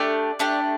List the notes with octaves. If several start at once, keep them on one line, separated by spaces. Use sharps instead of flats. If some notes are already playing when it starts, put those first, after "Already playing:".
Already playing: A3 D4 G4 D5
A3 D4 G4